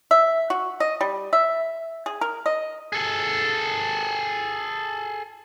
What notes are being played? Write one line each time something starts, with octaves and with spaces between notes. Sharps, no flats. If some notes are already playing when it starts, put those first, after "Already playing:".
E5
F#4
D#5
G3
E5
G#4
A#4
D#5
G#4 A4